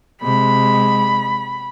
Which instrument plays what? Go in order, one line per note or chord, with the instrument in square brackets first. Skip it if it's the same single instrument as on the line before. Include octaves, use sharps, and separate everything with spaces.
[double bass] C3 G#3 [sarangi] B5